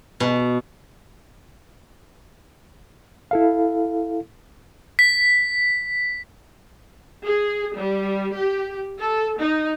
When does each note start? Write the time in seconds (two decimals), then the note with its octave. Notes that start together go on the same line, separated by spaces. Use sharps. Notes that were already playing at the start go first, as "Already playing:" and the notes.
0.20 B2
3.31 E4 A4 F5
4.99 B6
7.24 G#4
7.76 G3
8.36 G4
9.00 A4
9.38 D#4